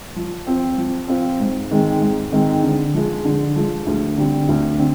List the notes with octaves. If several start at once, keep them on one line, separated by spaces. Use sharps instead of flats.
F3
C4 F4 C5
F3
C4 F4 C5
G#2
D#3 G#3 C4
G#2
D#3 G#3 C4
D3
F3 G#3
D3
F3 G#3
D2
D3 G3 C4
D2
D3 C4